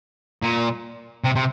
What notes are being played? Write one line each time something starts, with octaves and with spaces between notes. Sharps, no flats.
A#2
C3
C3